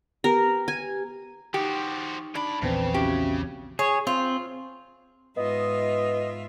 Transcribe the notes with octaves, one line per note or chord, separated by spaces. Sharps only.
B3 G4 A#4
G#5
F3 D#4 F#4 G4
A2 D4 B5
A#1 E2 C#3 C4 B4 C5 G5
C#4 F#4 G4 E5
G#4 C#5
C4 F4
G#2 B3 F4 D#5 E5